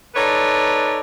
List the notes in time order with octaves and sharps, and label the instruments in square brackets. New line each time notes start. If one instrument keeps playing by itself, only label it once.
[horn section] D#4 A4 B4 C#5 D5